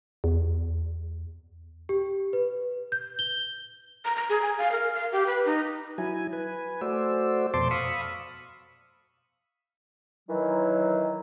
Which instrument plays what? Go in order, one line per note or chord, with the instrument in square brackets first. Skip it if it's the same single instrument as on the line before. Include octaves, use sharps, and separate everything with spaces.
[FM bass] E2
[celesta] G4
B4
G6
G7
[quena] A#5
A#5
G#4
G#5
F5
A#4
F5
G4
B4
D#4
[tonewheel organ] F#3 E4 G#5
B4 G#5
A3 F#4 C5 D5 E6
F2 B2 C5 A5 C6 D6
F5 B5 C#6 D#6 E6
[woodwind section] D#3 E3 F#3